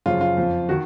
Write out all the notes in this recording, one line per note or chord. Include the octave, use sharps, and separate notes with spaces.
F#2 C#3 F3 F4
F4
F2 F3
D#3 F#4